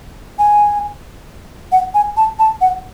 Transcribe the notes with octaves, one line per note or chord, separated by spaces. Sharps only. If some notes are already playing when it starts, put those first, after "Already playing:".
G#5
F#5
G#5
A5
A5
F#5